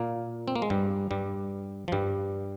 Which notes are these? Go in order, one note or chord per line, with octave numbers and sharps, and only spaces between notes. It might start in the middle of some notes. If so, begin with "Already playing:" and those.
Already playing: A#2 A#3
C4
A#3
G#3
G2 G3
G2 G3
F3
G2 G3